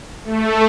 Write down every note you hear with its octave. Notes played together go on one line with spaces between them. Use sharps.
A3